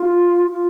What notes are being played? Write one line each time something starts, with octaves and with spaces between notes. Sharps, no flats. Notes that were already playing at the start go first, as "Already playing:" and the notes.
Already playing: F4
F4